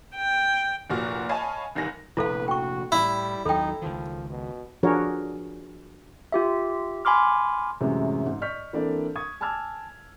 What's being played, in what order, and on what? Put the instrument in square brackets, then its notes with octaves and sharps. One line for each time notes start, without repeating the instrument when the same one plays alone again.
[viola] G5
[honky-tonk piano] F1 A#2 F#4 F6
C#5 D#5 F5 G#5 A5 B5
F1 C2 D#3 G#5 A#6
[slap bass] F1 A#1 [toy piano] E4 A4 F5 [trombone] B4
[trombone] F#4 [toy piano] G5 C#6
[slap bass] A2 [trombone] G3 [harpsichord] E4
[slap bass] D#2 F#3 [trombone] D#4 [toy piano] A4 G5
[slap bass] C#2 D#3 [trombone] F3
[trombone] B2
[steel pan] F3 D4 F#4 G#4 A#4 C#5
[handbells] F4 G4 E5
G#5 B5 C6 D6 F6
[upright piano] F#2 A2 C3 E3 G#3 C#4
G#2
D5 D#5 C#6 F6 G6 B6
E3 A#3 C4 D4 A4 D5
C#6 D#6 G#6
G#5 A5 D6 E6 F6 G#6